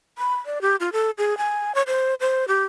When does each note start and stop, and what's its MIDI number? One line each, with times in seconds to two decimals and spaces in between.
0.18 0.36 83
0.46 0.61 74
0.61 0.76 67
0.80 0.89 65
0.93 1.11 69
1.18 1.37 68
1.38 1.74 80
1.75 1.82 73
1.87 2.14 72
2.20 2.45 72
2.48 2.64 67